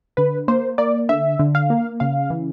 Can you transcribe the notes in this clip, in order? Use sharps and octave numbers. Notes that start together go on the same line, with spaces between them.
D3 B4
A#3 C5
A#3 D5
D3 E5
D3
F5
A#3
C#3 F5
E3